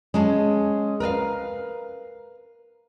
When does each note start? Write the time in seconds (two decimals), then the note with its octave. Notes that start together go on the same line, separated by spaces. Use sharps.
0.14 G#3 C#4 G#4 A5
1.00 A#4 B4 D#5 F5